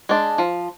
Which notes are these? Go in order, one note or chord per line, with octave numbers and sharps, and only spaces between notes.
G#3 D4
F3